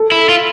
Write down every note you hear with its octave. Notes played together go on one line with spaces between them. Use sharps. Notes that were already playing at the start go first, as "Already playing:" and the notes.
Already playing: A4
E4
F4